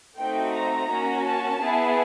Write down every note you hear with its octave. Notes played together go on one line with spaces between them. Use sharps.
A3 C4 D#4 F#4 G5
A#5
A#3 C#4 F#4
A5
B3 E4 G#4